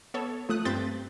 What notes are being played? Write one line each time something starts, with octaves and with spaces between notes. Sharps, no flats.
B3 A4 C#5
F3 A3 D#6 F#6
G2 C4 G6 A6 B6